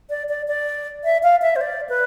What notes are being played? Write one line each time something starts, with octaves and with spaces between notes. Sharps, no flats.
D5
D5
D5
E5
F5
E5
C5
D5
B4